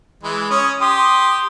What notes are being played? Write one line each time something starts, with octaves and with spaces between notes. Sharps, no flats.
E3 G#3
C#4 C#5 D#6
G4 C6 D#6